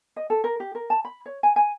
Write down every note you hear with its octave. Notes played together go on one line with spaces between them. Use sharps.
D#5
A4
A#4
G4
A#4
A5
B5
C#5
G#5
G#5